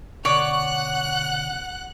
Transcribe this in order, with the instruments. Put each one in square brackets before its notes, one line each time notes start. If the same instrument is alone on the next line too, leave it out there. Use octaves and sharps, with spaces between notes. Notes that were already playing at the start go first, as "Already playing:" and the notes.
[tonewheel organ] B2 D3 [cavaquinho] C#5 D5 C#6 [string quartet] F#5 F#6